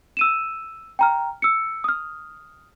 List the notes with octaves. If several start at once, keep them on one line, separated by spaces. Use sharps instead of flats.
E6 D#7 E7
G5 A#5 F6
E6 C#7
D#6 F6